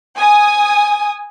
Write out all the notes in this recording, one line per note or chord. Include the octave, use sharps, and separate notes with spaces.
G#5 D#6